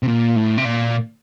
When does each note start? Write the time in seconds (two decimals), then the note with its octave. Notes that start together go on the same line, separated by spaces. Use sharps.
0.03 C3
0.08 A#2
0.36 A2
0.58 C3
0.65 A#2